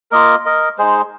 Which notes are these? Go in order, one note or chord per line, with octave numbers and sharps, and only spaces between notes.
A#3 F4 A#4 D#5
A#4 D#5
G#3 D#4 G#4 C5